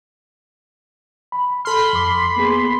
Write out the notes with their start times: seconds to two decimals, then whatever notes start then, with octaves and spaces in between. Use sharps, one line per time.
1.32 B5
1.65 A4 B5 C6 F6
1.93 F2 D6
2.37 A#3 B3 G#4